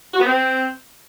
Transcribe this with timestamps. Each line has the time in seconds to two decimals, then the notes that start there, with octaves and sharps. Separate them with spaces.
0.14 F#4
0.20 B3
0.26 C4